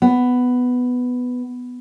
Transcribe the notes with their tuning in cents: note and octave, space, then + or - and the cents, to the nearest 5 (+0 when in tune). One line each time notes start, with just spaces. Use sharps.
B3 +5